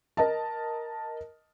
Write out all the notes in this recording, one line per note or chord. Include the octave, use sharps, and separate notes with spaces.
A#4 D#5 A5